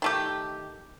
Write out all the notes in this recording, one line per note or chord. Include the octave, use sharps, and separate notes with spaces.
D#3 A3 G4